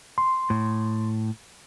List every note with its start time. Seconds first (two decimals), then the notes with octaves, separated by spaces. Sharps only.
0.18 C6
0.50 A2